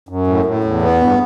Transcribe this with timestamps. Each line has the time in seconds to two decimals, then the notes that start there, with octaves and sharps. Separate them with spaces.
0.09 F#2
0.27 A2
0.45 A2
0.64 E2
0.82 B3
1.01 G2